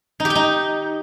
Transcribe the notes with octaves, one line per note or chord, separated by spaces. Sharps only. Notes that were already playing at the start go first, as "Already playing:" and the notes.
D#4
G4
G5
D#4